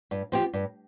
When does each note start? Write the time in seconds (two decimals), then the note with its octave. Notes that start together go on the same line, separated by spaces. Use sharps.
0.11 G2
0.32 F3 C4 G4
0.53 G2